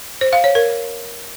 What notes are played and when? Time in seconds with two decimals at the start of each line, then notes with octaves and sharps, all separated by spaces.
0.21 C5
0.33 F5
0.44 C#5
0.55 A#4